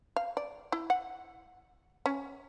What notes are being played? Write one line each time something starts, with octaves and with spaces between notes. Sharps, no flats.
F5
D5
E4
F#5
C#4